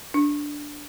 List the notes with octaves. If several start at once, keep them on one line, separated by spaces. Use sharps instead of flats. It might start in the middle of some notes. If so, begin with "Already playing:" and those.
D4